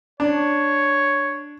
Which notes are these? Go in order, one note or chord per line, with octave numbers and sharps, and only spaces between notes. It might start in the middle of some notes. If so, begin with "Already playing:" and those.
D4 C#5